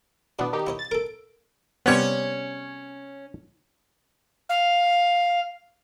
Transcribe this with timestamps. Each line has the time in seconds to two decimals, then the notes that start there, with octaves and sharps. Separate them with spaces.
0.39 B2 B3 D4 E4
0.53 D#3 D#4 G4
0.67 E4 C#5 D#5
0.79 A6
0.91 A4 A#4 D7
1.86 C3 G3 B3 C#4 C#5
4.49 F5